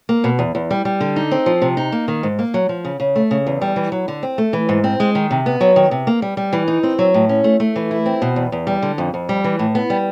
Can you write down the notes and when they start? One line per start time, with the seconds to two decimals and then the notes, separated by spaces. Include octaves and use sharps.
0.09 A#3
0.24 B2
0.39 E2
0.55 E2
0.71 G3
0.85 G3
1.01 D3
1.16 D#4
1.31 C4
1.46 F3
1.62 C3
1.77 D#4
1.92 A#3
2.08 D#3
2.23 G#2
2.39 A#3
2.54 F#3
2.69 F3
2.85 C#3
3.00 C#3
3.16 A3
3.31 C#3
3.47 E2
3.62 G3
3.76 E3
3.92 F#3
4.08 D3
4.23 C4
4.38 A3
4.53 E3
4.69 G#2
4.84 C4
5.00 G#3
5.15 D#3
5.31 C3
5.46 B3
5.61 F#3
5.76 D#3
5.91 C3
6.07 A#3
6.22 G3
6.37 G3
6.53 E3
6.68 D#4
6.83 C4
6.99 F#3
7.14 A2
7.29 C#4
7.44 A3
7.60 A3
7.76 E3
7.91 E4
8.06 C4
8.22 B2
8.36 E2
8.52 E2
8.67 G3
8.82 D3
8.98 F2
9.14 F2
9.29 G3
9.44 E3
9.59 A2
9.75 B3
9.90 G3